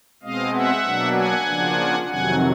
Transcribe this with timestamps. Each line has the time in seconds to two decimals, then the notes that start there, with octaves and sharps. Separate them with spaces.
0.22 B2 G#3 C4 D#5 F5
0.53 E5 F#5
0.85 B2 F#3 A#3 D4
1.15 F#5 G#5
1.46 C#3 F3 A#3 D4
2.07 F2 C3 D#3 F#3 F#5 G#5